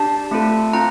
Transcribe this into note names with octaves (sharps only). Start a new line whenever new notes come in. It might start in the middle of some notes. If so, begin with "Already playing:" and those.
Already playing: D4 G4 A5
A3 C4 F4 A4
C4 F4 A#5